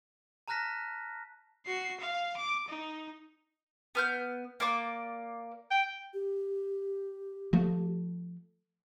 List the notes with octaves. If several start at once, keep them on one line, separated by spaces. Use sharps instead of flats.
A5 A#5 F6 F#6 A#6 B6
F#4 C7
F5
D6
D#4
B3 F6 G6
A#3 D5 D6
G5
G4
F3 A3